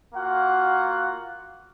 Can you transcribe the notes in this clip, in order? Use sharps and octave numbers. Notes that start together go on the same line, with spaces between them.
A#3 F4 F#4 F5 F#5